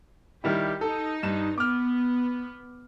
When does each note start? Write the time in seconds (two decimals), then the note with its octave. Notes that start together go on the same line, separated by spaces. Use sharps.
0.44 D#3 G3 E4 G4
0.81 D#4 A4
1.23 G2 E7
1.58 B3 D6 F6